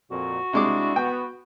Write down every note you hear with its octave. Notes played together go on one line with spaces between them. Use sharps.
F2 A#2 F#4
C3 G#3 D4 E4 D6
B3 G5